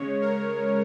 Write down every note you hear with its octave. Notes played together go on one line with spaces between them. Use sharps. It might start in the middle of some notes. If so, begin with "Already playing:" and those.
Already playing: C#3 G#3 C#5
A#4